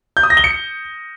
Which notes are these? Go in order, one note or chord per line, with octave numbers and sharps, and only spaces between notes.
G6
D#6
A#6
G7
C#7